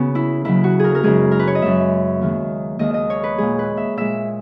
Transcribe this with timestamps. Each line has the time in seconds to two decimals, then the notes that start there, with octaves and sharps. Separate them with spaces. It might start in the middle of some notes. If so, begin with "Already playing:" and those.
Already playing: C#3 B3 C#4 F#4
0.15 E4
0.45 D#2 C#3 F#3 E4
0.64 F#4
0.79 G#4 A#4
0.95 A#4
1.03 F#2 C#3 G#3 G#4
1.31 A#4
1.39 B4
1.47 C#5
1.55 D#5
1.62 F#2 C#3 G#3 E5
2.21 D#2 D#3 G#3
2.79 D#2 D#3 G#3 D#5
2.94 D#5
3.10 C#5
3.23 B4
3.38 A#2 G#3 G#4
3.59 B4
3.77 E5
3.97 A#2 G#3 E5